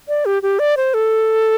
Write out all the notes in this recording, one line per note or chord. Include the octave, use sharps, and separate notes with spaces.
D5
G4
G4
D5
C5
A4